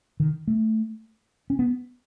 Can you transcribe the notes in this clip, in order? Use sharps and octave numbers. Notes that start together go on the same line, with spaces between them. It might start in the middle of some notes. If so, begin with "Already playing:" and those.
D#3
A3
C#4
B3